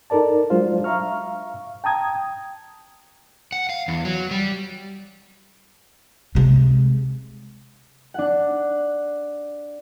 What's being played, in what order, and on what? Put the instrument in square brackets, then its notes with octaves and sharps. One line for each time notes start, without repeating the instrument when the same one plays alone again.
[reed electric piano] D#4 A4 A#4 D5 A5
F#3 G#3 D4 F4 C5 F5
E5 F5 A#5 C#6 F6
G5 A5 A#5 D#6 G#6
[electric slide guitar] F#5
F5
E2
F#3
G3
[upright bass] C3 G#3
[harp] D4 F#5